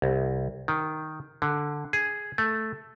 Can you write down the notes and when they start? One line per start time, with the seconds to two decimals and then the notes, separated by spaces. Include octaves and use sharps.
0.02 C2
0.68 D#3
1.42 D3
1.93 G#4
2.38 A3